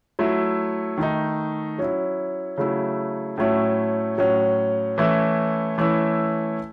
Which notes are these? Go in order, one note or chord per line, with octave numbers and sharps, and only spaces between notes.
F#3 A3 E4
D#3 A3 D#4
F#3 C#4 E4
C#3 F#3 A3 E4
A2 F#3 A3 C#4 E4
A2 F#3 C#4
E3 A3 C#4 E4
E3 A3 C#4 E4